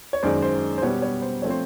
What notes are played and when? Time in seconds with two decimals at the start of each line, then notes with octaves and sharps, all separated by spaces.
0.13 C#5
0.23 F#2 D#3 G#3 C5 D5
0.42 C5
0.78 C5
0.82 B2 G3 B3 C#5
1.02 C#5
1.22 C5
1.42 F3 A3 C4 C#5
1.50 C5